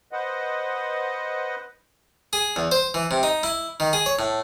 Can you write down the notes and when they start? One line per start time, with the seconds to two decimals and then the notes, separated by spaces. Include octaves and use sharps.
0.12 B4 C5 D#5 F#5
2.33 G#4
2.56 E2
2.72 C5
2.94 E3
3.11 C3
3.23 D#4
3.43 E4
3.80 D#3
3.93 G#4
4.06 C#5
4.19 A2